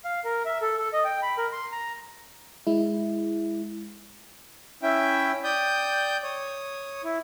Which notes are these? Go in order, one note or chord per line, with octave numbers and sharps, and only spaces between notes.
F5
A#4
E5
A4
A4
D#5
G5
B5
A#4
C6
A#5
G#3 E4
C#4 E4 E5 G5
D5 G5 D#6 G6
C#5 D#6
E4